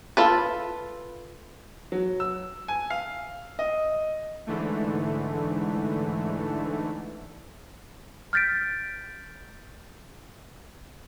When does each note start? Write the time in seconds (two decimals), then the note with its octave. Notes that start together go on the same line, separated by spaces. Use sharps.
0.17 F4 A4 B4
1.92 F#3
2.20 E6
2.68 G#5
2.90 F5
3.59 D#5
4.47 G#2 D3 E3 A3
8.33 F6 G6 A6 B6 D7